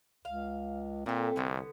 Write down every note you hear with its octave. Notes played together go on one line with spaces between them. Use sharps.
C#2 F5
A#2 A3 C4 A4
C2 D3 B3